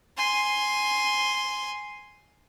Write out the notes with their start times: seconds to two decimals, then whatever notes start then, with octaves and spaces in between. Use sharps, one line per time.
0.17 G#5 C6